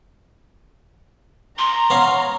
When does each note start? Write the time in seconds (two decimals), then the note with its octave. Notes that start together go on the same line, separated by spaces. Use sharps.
1.58 A#5 C6
1.90 B3 C#4 F5